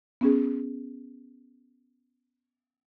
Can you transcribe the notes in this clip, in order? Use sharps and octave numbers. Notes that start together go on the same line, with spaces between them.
B3 C#4 G#4